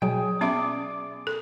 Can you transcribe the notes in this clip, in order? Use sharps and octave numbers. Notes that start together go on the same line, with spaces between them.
B2 F#3 G#4 G5
B3 C#4 D5 E5 D6
A4